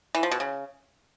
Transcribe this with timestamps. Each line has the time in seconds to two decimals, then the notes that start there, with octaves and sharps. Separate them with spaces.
0.15 E3
0.23 F3
0.32 B2
0.40 C#3